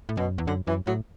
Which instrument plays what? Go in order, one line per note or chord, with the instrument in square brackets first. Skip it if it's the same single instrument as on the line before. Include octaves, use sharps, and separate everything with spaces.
[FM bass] A2
[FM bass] F#2 [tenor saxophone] B2
[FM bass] E2
[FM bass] F#2 [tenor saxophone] D3
[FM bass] F#2 [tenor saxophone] E3
[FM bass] A2 [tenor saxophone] F#3